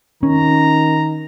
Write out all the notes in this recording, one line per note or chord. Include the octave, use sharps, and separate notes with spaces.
D#3 C#4 A#5